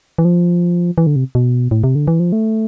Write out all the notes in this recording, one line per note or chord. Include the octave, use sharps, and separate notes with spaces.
E3
F3
E3
D3
C3
B2
A2
C3
D3
E3
F3
A3